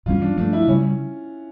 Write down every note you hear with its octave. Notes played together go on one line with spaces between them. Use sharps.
G2 E3 G3 C#4 F4
D4
G2 F3 A3 D4
E4
C#3 G3 C#4